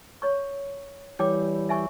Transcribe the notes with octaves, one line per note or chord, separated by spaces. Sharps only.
C#5 C#6
E3 G3 C#5 G5 D6
E5 G#5 C#6